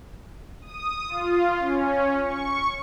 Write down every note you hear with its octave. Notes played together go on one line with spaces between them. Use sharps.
D#6
F4
C#4
C#6